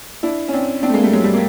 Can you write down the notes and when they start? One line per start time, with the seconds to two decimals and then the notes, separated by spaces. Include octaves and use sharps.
0.23 D4 E4
0.48 C#4
0.53 C4 D4
0.83 C4 D4
0.89 A3
0.94 G#3 A#3
1.03 G3 A3
1.13 F#3 G#3
1.24 G3 A3
1.34 A#3